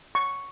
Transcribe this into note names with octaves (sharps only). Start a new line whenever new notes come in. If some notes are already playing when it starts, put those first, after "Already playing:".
C#6